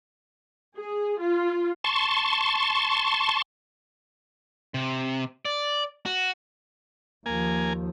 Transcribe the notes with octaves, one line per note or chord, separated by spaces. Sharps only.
G#4
F4
A5 C6 C#6
C3
D5
F#4
D#2 F3 A#3 G#5